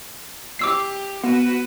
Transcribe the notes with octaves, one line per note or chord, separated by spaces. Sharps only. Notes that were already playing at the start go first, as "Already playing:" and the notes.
G4 D6 E6 C7
B3 F#4 B4